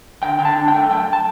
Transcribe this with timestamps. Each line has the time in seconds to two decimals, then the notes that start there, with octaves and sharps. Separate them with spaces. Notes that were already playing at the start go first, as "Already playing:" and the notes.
0.23 D3 G5
0.39 D3 G5
0.45 A5
0.57 D4
0.68 G5
0.74 A3
0.91 F#2 G5
1.13 A5